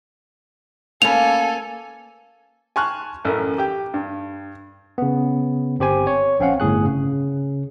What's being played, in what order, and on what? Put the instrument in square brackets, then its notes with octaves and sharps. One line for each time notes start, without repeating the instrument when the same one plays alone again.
[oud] A#3 C#4 B4 [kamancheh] A4 G#5 [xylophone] F7
[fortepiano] G#5 A5 C6 C#6 F6 F#6
A1 F#2 A4 A#4
G4 G5
G2
[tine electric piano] C#3 B3
G1 C4 G4 C5 G#5
C#5
A#1 C4 C#4 F5 F#5
G1 A2 G#4 F#6
C#3